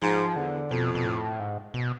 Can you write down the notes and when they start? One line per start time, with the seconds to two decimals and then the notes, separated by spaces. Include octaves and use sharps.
0.02 G#2 F3
0.36 E2 D3
0.70 F2 B2
0.95 B2
1.04 A2
1.40 G#2
1.74 B2